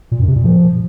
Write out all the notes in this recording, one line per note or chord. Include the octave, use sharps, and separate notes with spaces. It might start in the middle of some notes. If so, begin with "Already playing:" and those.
A#2
F#2
C3
A#2
F3